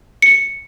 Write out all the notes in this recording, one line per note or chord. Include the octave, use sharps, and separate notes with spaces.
C#7